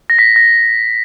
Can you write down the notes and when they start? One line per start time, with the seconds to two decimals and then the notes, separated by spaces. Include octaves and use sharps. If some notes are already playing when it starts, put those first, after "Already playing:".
0.10 A#6
0.19 B6
0.36 A#6